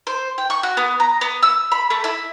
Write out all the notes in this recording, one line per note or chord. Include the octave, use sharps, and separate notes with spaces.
C5
G5
C#6
F#4
B3
A#5
B3
E6
B5
A3
E4